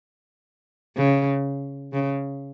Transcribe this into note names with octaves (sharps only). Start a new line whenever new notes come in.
C#3
C#3